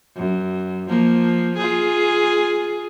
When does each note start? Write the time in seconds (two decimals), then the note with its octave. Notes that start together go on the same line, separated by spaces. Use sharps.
0.16 F#2
0.89 F3 A#3
1.58 F4 G#4